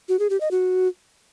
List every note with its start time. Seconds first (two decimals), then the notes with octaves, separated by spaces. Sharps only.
0.09 F#4
0.19 G#4
0.30 G4
0.40 D#5
0.51 F#4